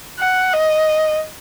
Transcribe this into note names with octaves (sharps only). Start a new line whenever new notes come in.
F#5
D#5